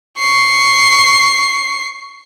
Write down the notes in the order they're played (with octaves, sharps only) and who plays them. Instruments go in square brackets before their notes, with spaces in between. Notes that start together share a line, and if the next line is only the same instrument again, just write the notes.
[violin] C#6 C7